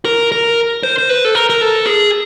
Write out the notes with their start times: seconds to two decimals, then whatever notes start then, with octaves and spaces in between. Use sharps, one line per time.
0.05 A#4
0.32 A#4
0.83 C5
0.98 C5
1.09 B4
1.25 A4
1.35 A#4
1.50 A#4
1.61 A4
1.87 G#4